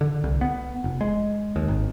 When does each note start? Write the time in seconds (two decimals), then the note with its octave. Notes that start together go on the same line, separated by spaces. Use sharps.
0.01 D3
0.24 C2
0.41 B3
0.84 F1
1.01 G#3
1.56 D#2
1.68 G#1